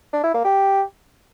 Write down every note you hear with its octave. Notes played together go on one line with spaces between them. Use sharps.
D4
E4
A#3
G4